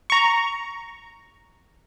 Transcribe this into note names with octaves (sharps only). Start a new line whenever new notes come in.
A#5 C#6